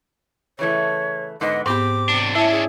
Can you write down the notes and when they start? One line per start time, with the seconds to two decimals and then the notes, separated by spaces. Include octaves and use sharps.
0.59 C#3 E3 A3 C#5
1.41 G#2 D3 B3 D#5
1.66 G#2 B3 C4 G4 B5 D6
2.09 C3 D4
2.35 C#4 D4 E4 E5 A5
2.51 G#4